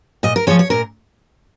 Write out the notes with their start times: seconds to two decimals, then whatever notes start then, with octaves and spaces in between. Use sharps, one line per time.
0.23 A#2 D#5
0.36 A#4
0.47 F3 G#3 C#5
0.59 C#5
0.70 A#2 A#4